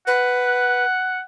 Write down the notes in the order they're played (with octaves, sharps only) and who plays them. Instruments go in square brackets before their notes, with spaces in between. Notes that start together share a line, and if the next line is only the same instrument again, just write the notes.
[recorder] B4 [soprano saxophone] F#5